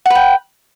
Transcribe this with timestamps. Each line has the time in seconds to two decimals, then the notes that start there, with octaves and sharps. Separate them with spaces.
0.06 F#5
0.10 B4
0.15 G5